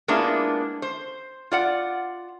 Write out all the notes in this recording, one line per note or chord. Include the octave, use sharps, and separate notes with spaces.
G#3 A#3 B3 D4 E4 F4
C5
F4 D5 F#5